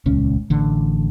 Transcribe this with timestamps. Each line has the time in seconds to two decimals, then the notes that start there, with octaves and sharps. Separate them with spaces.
0.06 D#1 C#2 C#4
0.50 A1 D3